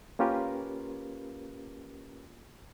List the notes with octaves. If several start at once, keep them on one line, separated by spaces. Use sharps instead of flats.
A#3 C#4 F4 G4 A#4 B4